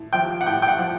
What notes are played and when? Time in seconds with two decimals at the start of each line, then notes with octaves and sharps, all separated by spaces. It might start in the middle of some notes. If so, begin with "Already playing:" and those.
Already playing: A2
0.13 F3 G5
0.41 F#5
0.46 A2 G5
0.62 G5
0.68 F#5
0.79 F3